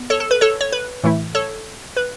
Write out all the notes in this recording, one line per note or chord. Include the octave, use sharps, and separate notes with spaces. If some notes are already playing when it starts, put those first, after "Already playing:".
Already playing: B3
A4 C#5
A4
B4
A4 C#5
C#5
B4
A2 E3 A3 E4
A4 C#5
B4